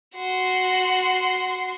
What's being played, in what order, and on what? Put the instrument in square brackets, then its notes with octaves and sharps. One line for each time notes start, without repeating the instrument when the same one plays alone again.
[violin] F#4 C6